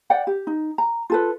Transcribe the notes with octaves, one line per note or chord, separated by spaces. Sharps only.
D5 F#5 G5
G4
D#4
A#5
F4 A4 B4